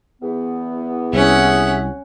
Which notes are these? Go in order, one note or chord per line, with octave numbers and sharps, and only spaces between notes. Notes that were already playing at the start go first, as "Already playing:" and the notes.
E2 B3
C2 C#4 G#4 E5 F#5